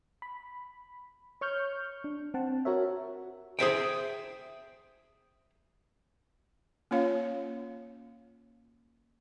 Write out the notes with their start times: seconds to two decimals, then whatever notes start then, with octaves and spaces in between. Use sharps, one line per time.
0.22 B5
1.41 C#5 C#6 F6 G6
2.04 D4
2.34 C4 F#5 A5
2.65 F#4 A#4 C#5 E5
3.59 G#4 C5 E5 G5
6.91 A#3 C#4 F4 C#5 F5